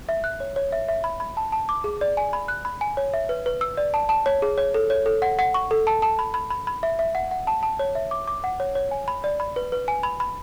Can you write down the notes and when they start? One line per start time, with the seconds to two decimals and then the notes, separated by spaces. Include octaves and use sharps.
0.09 E5
0.24 F#6
0.40 C#5
0.56 C#5
0.72 E5
0.88 E5
1.04 B5
1.20 B5
1.37 A5
1.52 A5
1.69 D6
1.84 G#4
2.01 D5
2.17 G#5
2.33 B5
2.48 F#6
2.65 B5
2.81 G#5
2.97 C#5
3.13 E5
3.29 B4
3.46 B4
3.61 E6
3.77 D5
3.94 A5
4.09 A5
4.26 C#5
4.42 G#4
4.58 C#5
4.74 A4
4.90 C#5
5.06 A4
5.22 F#5
5.39 F#5
5.54 C#6
5.71 A4
5.87 A5
6.02 A5
6.19 B5
6.34 B5
6.50 B5
6.67 B5
6.83 E5
6.99 E5
7.15 F#5
7.31 F#5
7.47 A5
7.63 A5
7.79 C#5
7.95 E5
8.11 D6
8.28 D6
8.44 F#5
8.60 C#5
8.75 C#5
8.91 G#5
9.08 B5
9.24 D5
9.40 B5
9.56 B4
9.72 B4
9.88 G#5
10.03 B5
10.20 B5